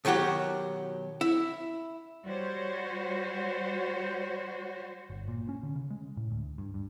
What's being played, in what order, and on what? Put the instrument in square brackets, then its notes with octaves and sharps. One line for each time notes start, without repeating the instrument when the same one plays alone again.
[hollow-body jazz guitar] B2 D#3 F#3 F#4 G4
E4
[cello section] G3 F#4 C5 C#5
[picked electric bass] G1
A#2
C#4
D3
C#3
G#3
A2
D2
G2
G2